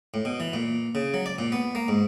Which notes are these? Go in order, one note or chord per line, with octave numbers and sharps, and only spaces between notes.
A2
B2
E3
A#2
C#3
F#3
D5
A#2
B3
A#3
G#2